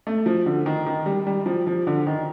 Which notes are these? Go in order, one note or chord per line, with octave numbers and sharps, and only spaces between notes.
A3
F3
D3
D#3
D#3
G3
G3
F3
F3
D3
D#3